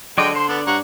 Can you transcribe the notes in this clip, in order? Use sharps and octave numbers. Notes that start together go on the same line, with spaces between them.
D3 F#3 G#3 D5 D#5 G5
C5 C6
B3 D4 A4
G2 C#5 F#5 A#5